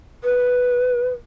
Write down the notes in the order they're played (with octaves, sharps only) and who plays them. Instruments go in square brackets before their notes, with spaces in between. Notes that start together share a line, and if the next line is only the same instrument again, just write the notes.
[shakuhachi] B4